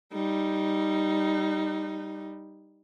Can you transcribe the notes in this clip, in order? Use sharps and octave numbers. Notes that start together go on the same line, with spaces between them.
G3 D#4